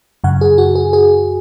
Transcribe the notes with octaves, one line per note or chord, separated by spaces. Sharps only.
F#2 C#3 F#5
G#4
F#4
G#4
G#4